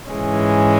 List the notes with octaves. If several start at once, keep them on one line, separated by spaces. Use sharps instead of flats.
G#2 E3 G#3 C#4